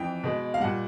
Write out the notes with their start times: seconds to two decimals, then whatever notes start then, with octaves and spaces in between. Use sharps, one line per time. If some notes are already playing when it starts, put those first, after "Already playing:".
Already playing: F2 E3 G5
0.23 B2 G#3
0.54 F5
0.60 A#2 G3 F#5